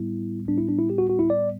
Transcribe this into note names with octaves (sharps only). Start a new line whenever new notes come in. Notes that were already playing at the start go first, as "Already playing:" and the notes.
Already playing: A2 G3 B3 E4
A2 G3 B3 D4
E4
D4
E4
G4
F#4
F#4
E4
D5